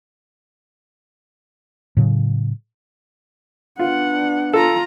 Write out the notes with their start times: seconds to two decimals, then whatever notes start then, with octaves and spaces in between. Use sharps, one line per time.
1.97 A2 C#3 F#3
3.79 B3 D4 F4 F#5
4.53 F4 A4 A#5